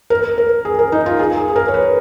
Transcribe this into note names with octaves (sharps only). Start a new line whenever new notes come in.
A#4
A#4
G#4
A#4
D#4
F4
G#4
G#4
G#4
A#4
C#5
B4